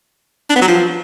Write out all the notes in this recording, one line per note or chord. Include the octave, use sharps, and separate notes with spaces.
D4
B3
F#3
F3